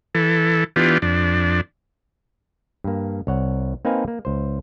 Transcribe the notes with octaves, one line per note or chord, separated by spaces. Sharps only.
E3 A4
E3 B3 D4 F4 G4
F2 D4
G2 A#3
C2 C#5 F#5
A#3 C4 D#4 B4 F5 G#5
A#3
C#2 C5